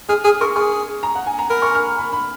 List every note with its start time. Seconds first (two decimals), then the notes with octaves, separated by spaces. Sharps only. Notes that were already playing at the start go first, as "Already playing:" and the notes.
0.09 G#4 F6
0.24 G#4 D#6
0.41 A#4 C#6
0.56 G#4 C#6
1.03 A#5
1.15 F#5
1.26 G#5
1.39 A#5
1.50 A#4 B5
1.62 C#6
1.75 F6
1.98 B5
2.13 B5